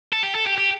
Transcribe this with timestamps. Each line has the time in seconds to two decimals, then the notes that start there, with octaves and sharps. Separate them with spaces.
0.13 A4
0.23 G4
0.35 A4
0.47 G4
0.58 G4